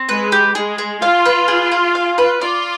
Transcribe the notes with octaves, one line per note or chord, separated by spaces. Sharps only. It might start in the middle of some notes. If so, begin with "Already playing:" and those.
Already playing: C4
G#3 B4
G4
G#3 G#4
G#4
F4 F5
B4
G#4
G#4
F5
B4
F4 D5